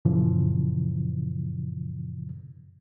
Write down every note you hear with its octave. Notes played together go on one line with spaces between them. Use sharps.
F#2 A#2 C#3 E3 F3